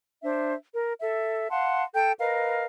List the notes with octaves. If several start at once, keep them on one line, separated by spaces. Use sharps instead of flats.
D4 C5 E5
A#4
A4 E5
F5 F#5 A5 C6
A4 G5 G6
A#4 B4 D#5 F5